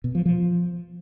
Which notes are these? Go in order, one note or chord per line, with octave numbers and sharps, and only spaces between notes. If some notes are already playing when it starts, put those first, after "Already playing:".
B2
F3
F3